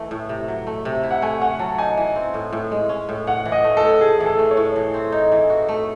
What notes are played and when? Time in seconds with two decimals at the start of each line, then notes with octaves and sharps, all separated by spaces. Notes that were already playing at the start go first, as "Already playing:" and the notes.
Already playing: E3 A3
0.11 A2
0.29 C3
0.48 F#3
0.67 A3
0.85 C3
1.03 E4
1.11 F#5
1.22 A3 G#5
1.41 C#4 F#5
1.59 F#3 A5
1.78 D#4 G#5
1.97 E3
2.16 C4
2.34 A2
2.53 A2
2.72 G#3
2.89 C#4
3.09 A2
3.27 C#4 F#5
3.45 E3
3.52 D#5
3.64 A3
3.77 A4
3.83 A2
4.01 A2 G#4
4.20 E3
4.26 A4
4.39 A3
4.51 C#5
4.57 A2
4.76 E3
4.94 C4
5.12 D#4
5.32 E3
5.50 F#4
5.69 A3